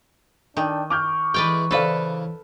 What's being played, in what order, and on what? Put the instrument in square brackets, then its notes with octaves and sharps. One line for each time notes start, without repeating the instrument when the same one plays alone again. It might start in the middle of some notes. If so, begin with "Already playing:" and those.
[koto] D#3 [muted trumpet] D4 [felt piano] G5
[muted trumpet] C#6 [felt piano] D6 F6 G6
[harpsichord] E3 G#3 [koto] B4 D5 G5
[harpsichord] C#3 E3 [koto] A4 B4 [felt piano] C5 D5 F5